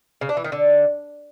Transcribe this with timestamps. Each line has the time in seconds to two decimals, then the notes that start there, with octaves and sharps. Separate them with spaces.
0.21 C#3
0.29 D4
0.37 E3
0.44 D#3
0.52 D3